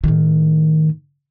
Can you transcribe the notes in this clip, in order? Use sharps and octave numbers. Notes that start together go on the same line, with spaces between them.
A2 D#3